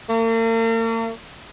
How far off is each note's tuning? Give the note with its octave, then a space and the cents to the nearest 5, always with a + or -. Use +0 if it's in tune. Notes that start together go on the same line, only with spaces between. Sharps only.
A#3 -45